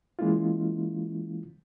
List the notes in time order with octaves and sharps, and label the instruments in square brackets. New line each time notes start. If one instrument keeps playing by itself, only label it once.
[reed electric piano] E3 G#3 A#3 C#4 E4 F4